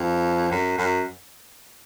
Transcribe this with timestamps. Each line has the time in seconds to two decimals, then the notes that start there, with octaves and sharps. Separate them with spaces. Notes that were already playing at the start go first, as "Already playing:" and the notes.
Already playing: F2
0.52 F#2
0.78 F#2